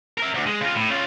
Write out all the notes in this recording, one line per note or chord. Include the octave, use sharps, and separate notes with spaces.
A#4 E5
D2
G#3
C#3 F4
A2
C#4 F4